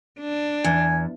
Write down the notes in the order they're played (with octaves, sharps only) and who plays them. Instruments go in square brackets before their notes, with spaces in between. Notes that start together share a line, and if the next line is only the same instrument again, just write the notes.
[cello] D4
[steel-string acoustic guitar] E2 [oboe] G#5